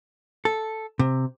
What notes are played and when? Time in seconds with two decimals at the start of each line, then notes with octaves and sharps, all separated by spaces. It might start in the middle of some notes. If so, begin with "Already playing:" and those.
0.45 A4
0.99 C3